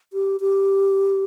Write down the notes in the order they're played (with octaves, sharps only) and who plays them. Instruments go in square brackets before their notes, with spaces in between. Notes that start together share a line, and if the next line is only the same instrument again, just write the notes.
[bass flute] G4
G4